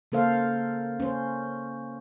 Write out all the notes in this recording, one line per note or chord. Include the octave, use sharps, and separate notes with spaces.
C#3 A#3 A4 C5 F5
C#4 C5